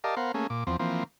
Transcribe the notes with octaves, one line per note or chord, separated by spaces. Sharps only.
G4 A#4 D5 D#5 F5 A5
B3 A#4 C5 F5 F#5
A3 A#3 C#4 G#4
A#2 D6
E2 F3 C4
E3 F3 A#3 C4